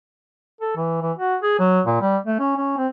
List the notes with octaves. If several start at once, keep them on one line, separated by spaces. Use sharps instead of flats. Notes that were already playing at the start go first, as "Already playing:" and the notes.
A4
E3
E3
F#4
G#4
F#3
A#2
G3
A3
C#4
C#4
C4